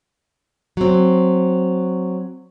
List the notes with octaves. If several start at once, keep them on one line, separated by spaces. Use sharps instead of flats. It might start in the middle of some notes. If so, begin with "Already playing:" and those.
F#3 C4